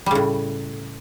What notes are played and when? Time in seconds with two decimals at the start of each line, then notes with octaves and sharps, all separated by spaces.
0.06 G3
0.11 C#3
0.15 A2